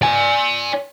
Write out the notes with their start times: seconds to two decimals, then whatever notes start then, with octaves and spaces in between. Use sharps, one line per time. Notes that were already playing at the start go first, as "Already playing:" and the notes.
0.02 D5 G#5